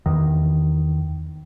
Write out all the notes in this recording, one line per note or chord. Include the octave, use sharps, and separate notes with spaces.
E2 D#3